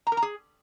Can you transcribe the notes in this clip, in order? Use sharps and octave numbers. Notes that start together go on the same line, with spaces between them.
A#5
A#4
A#5
G#4